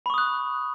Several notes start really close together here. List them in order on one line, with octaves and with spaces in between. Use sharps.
B5 C#6 D#6 F#6